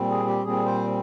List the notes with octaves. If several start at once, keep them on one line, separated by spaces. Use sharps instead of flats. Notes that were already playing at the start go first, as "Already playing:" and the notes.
Already playing: A#2 G3 C4
G#4
G4
A#2 G3 C4 G#4
C5